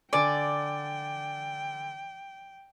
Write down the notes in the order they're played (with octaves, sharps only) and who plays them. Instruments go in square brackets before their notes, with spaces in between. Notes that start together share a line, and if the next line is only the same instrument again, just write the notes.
[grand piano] D3 G#5 [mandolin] D5 [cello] G5